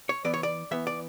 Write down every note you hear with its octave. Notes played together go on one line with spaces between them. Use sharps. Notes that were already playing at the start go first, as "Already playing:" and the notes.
C#5
E3 B3 D5
C#5
D5
E3 B3 E5
D5